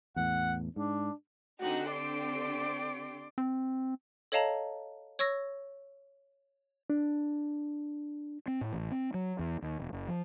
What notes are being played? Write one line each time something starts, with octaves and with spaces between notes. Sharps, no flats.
E2 A2 F#5
G#2 D4
D3 C4 D#4 F#4 G4 F#6
G4 D5 C6 D7
C4
A4 C#5 D#5 F5 A5 A#5
C#5 C#6 E6 A#6
D4
C4
A2
A1
C4
F#3
E2
D#2
E1
F#1
F3